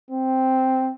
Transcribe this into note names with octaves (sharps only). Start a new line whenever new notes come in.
C4